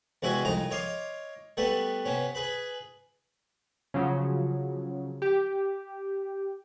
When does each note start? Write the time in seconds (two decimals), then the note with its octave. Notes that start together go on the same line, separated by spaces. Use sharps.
0.22 E2 C3 G#3 F#4 E5 G#5
0.45 C2 F2 D#4 A#5
0.71 C#5 D#5 F5 C6 D6
1.57 G3 A3 B3 A4 B4
2.05 C3 B3 C#4
2.35 G#4 B4 B5
3.94 C#3 F3 F#3
5.22 G4